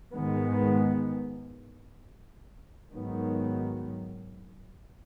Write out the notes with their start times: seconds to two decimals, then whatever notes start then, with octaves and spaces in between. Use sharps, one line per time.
0.12 G#2 D#3 G#3 B3
2.90 G#2 D#3 F#3 B3